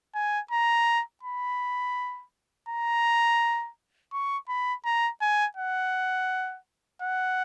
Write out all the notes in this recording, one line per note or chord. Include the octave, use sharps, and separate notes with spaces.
G#5
A#5
B5
A#5
C#6
B5
A#5
G#5
F#5
F#5